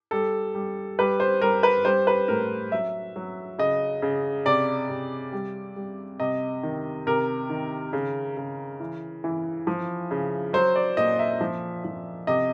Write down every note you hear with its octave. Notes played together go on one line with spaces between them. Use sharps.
G3 A4
G3
G3 B4
C5
G3 A#4
B4
G3 C5
B4
A2 A#4
F#3 E5
F#3
C#3 D#5
C#3
C3 D5
C3
G3
G3
C3 D#5
D#3
C3 A#4
D#3
C#3
C#3
E3
E3
F3
C#3
F#3 C5
D5
A#2 D#5
E5
F3
F3
C3 D#5